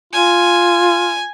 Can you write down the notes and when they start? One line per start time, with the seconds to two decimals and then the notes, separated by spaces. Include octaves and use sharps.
0.13 F4 G#5